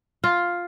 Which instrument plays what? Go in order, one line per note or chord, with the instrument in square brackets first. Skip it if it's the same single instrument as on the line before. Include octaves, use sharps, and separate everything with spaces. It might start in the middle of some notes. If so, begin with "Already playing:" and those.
[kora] F4